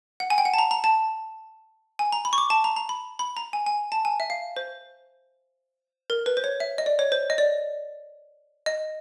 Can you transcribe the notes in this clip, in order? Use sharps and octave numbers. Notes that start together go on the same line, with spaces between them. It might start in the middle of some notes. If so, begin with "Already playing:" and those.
F#5
G#5
G5
F#5
A5
A#5
A#5
A5
G#5
A#5
B5
C#6
D6
A5
A#5
A#5
B5
B5
A#5
G#5
G#5
A5
G#5
E5
F5
C5
A#4
B4
C5
C#5
E5
D#5
D5
C#5
C5
D#5
D5
D#5